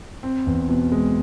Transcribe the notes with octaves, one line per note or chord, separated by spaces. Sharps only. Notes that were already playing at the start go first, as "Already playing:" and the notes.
C4
E2
B2
G#3